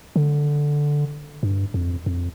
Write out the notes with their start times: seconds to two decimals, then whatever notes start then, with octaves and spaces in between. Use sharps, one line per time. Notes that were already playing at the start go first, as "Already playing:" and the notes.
0.16 D3
1.43 G2
1.74 F2
2.06 F2